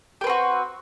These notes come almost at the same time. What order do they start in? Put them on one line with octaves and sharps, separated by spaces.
G4 B4 C4 F#4